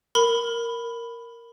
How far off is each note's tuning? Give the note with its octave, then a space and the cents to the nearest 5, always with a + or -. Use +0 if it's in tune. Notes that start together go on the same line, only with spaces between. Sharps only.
A#4 +0 B5 +5